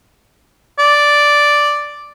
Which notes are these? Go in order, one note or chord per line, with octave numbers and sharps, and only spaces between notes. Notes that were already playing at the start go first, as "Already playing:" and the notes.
D5